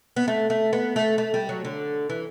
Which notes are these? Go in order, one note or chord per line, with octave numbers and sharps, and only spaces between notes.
B3
A3
A3
B3
A3
A3
G3
F#3
D3
E3